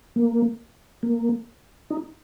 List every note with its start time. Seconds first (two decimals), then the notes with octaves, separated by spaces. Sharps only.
0.16 A#3
1.03 A#3
1.90 D#4